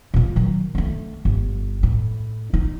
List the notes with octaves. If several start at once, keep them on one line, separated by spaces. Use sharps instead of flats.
A#2 G#3
D#3 F#3
D3 A3
G1
A2
D#4